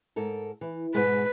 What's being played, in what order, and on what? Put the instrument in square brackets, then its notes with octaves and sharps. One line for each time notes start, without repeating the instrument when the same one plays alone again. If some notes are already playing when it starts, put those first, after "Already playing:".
[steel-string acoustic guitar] G#2 A4 A#4
E3
[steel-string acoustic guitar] G#2 B2 G#3 [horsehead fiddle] B4